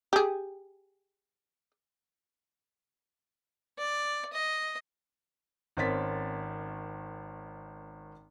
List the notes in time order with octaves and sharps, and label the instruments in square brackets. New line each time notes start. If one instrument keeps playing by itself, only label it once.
[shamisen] G4 G#4
[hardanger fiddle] D5
D#5
[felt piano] G#1 D#3 C4 C#4 A6 B6